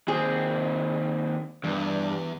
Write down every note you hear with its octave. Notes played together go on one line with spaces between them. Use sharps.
D#2 C4 G#4
E2 G2